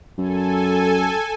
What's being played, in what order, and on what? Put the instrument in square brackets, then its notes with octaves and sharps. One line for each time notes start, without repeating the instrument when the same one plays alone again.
[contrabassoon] F#2 [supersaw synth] A4 G#5